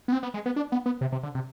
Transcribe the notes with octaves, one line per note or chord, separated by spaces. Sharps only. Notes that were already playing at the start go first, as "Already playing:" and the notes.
B3
C4
B3
G#3
B3
D4
B3
B3
C3
C3
D3
C3